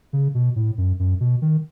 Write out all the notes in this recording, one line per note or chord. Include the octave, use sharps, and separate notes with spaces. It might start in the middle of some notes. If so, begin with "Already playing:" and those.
C#3
B2
A2
F#2
F#2
B2
D#3